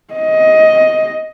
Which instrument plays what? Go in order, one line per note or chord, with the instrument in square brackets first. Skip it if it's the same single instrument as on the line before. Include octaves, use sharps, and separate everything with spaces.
[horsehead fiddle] D#5